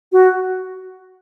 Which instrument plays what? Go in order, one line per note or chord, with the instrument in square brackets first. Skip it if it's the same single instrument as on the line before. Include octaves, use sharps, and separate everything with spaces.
[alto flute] F#4